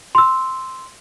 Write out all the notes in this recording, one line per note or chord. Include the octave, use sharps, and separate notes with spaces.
C6 E6